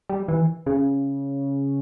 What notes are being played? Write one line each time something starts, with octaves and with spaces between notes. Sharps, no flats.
G3
E3
C#3